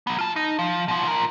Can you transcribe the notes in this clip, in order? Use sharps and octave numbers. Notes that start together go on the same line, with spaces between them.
F#3 B3
F4 A5
D#4
F3
B2 F3
F3 A#4